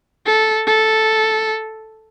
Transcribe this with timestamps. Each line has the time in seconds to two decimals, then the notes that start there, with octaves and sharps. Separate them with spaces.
0.26 A4
0.67 A4